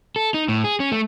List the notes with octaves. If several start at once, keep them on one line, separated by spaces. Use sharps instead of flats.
A4
D#4
A2
G#4
C#4
A3